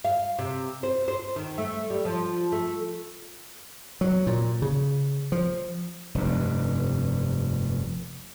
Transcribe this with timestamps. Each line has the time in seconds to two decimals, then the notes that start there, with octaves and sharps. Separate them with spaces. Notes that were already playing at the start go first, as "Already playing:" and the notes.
0.05 F5
0.39 C3
0.83 C5
1.08 C5
1.36 D#3
1.58 A3
1.90 G3
2.05 F3
2.52 A3
4.01 F#3
4.27 A#2
4.62 C#3
5.32 F3
6.15 F1 G2